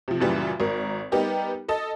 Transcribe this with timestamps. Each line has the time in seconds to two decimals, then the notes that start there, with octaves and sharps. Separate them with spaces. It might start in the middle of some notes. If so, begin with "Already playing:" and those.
0.08 C3 F3
0.20 F#2 A#2 C#3 E3 G3
0.60 G#1 A#4
1.12 G3 B3 D#4 G4 A#4
1.68 A4 D#5 A5